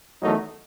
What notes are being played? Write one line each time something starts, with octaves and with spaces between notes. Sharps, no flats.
E2 D#3 F#3 A3 D#4